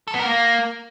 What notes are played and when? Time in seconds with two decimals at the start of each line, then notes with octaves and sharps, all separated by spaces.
0.08 A4
0.13 B3
0.19 A#4
0.25 A#3